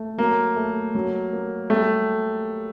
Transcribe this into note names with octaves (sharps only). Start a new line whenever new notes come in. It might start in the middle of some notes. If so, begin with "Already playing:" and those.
Already playing: A3
F#3 A#3
A3
F#3
A#3
G3 A3